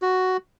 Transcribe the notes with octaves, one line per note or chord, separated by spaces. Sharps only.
F#4